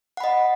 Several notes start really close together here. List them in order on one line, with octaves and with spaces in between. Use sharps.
F#5 B5 D#5